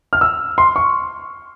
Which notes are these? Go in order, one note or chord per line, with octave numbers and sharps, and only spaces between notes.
F6
E6
C6
C#6